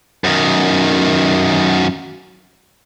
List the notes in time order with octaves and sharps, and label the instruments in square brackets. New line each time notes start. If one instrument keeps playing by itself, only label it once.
[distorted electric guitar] F#2 D#3